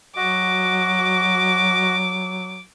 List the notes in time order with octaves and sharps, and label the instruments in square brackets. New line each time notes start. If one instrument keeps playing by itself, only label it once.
[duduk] F#3 [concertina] F#4 D#5 [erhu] D6